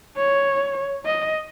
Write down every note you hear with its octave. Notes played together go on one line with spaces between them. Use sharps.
C#5
D#5